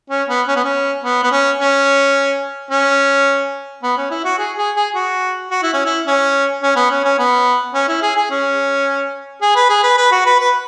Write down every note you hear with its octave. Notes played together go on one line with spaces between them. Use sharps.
C#4
B3
C#4
B3
C#4
B3
B3
C#4
C#4
C#4
B3
C#4
E4
F#4
G#4
G#4
G#4
F#4
F#4
E4
C#4
E4
C#4
C#4
B3
C#4
C#4
B3
C#4
E4
G#4
G#4
C#4
G#4
B4
G#4
B4
B4
F#4
B4
B4